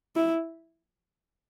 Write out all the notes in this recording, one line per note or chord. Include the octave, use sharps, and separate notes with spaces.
E4